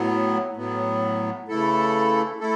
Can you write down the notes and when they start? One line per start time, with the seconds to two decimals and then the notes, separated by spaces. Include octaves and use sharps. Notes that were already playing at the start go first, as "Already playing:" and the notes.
Already playing: A2 F#3 B3
0.56 A2 F#3 B3
1.48 C#3 E3 A3 E4 A4
2.40 A3 E4 A4